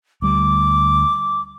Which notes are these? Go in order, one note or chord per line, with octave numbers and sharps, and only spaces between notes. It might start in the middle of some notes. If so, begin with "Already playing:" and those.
D2 G3 D6